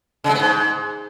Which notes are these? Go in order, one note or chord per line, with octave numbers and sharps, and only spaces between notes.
C#3
G#3
B3
G#2